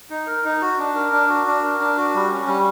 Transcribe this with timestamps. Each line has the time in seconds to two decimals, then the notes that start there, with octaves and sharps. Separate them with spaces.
0.10 D#4
0.27 A#4
0.45 D#4
0.61 F#4
0.79 D4
0.95 A#4
1.12 D4
1.29 F#4
1.47 D4
1.63 A#4
1.81 D4
1.97 F#4
2.14 G3
2.32 C#4
2.48 G3